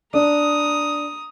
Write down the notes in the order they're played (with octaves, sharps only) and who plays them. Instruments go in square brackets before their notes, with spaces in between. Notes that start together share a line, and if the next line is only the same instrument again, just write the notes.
[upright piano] D4 [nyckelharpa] A#5 D#6